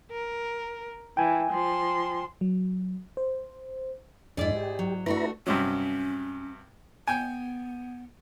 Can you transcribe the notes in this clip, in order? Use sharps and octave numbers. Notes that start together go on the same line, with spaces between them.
A#4
E3 G5 G#5
F3 C6
F#3
C5
F2 G#2 D4 E4 G#4 D5
G4
F#3
A3 D4 E4 F#4 B4 A#5
G2 C3 F#3 C#4
B3 G5 G#5